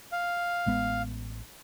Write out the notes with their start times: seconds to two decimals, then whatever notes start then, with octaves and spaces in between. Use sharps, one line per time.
0.12 F5
0.66 A1 G#3 B3